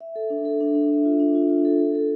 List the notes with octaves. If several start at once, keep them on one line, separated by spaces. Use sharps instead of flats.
E5
A4
D4
A4
D4
D4
E5
F4
D4
F4
F4
A4
A4
A4